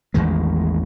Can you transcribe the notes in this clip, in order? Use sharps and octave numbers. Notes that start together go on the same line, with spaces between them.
A1 E2 D#3 G#3